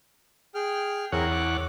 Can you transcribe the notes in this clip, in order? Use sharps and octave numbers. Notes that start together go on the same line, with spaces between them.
G#4 G5 F6
E2 C4 G#4 A#4 C#5 F#5
D6